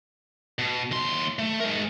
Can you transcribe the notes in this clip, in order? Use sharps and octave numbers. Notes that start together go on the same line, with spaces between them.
B2
D#2 C6
A3
G#3 A#4